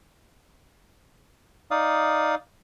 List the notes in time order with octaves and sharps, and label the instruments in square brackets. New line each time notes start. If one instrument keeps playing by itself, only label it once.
[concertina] D#4 D5 F5 D#6